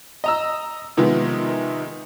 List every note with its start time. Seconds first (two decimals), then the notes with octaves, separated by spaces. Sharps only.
0.24 D#5 A#5 E6
0.97 C3 D#3 F3 G#3 B3